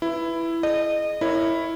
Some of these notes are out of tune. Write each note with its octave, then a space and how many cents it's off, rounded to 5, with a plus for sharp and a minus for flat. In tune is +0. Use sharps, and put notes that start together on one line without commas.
E4 +10 B4 +0
G#4 +35 D#5 -30
E4 +0 A#4 +0 C#5 +0